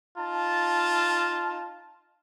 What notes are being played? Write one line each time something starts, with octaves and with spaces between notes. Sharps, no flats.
D#4 F4 A5